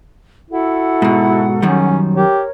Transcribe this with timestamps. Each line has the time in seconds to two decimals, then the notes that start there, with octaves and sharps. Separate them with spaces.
0.51 E4 F#4 A4 F#5
1.02 G#2 B2
1.62 F#2 D#3 G3 C#4
2.15 G4 A#4 C#5